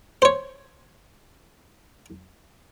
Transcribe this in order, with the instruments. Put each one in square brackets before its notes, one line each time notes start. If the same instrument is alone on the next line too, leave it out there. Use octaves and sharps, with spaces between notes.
[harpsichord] C5 C#5